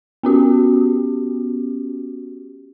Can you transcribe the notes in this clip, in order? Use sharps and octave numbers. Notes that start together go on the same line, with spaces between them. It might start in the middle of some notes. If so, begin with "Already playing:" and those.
B3 C#4 F#4 G4